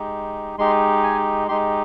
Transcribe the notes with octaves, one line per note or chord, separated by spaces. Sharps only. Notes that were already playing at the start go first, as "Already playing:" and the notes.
Already playing: G#3 D#4 G4
G#3 D#4 G4 C6
G#5
G#3 D#4 G4 C6